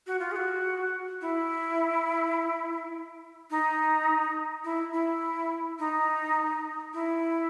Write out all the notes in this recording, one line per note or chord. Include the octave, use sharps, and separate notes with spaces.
F#4
F4
G#4
F#4
E4
D#4
E4
E4
D#4
E4